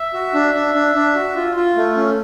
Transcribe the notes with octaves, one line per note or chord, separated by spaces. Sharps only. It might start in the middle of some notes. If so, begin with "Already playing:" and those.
Already playing: E5
F#4
D4
D4
D4
D4
F#4
F4
F4
A3
C#4